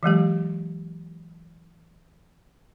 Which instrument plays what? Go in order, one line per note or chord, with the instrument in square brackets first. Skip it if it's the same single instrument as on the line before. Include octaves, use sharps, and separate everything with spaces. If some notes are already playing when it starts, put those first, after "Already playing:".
[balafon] E3 F#3 G#3 G4